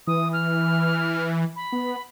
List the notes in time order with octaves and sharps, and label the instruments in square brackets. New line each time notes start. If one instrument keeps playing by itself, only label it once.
[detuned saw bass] E3 [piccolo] D#6
[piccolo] F6
B5
[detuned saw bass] B3